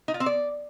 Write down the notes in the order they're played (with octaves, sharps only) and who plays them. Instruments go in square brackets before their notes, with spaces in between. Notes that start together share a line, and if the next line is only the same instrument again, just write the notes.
[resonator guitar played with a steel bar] D#4
F4
C4
D5